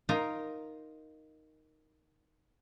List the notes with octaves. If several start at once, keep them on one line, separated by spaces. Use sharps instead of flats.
D#4 F4 A#4 A#5